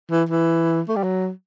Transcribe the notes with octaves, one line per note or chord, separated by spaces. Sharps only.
E3
E3
A3
G3
F#3